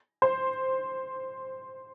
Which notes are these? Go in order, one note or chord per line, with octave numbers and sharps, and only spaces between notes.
C5